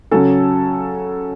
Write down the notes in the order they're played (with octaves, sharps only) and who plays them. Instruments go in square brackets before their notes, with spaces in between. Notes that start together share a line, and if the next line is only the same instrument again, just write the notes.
[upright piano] C#3 F#3 C#4 A4 A5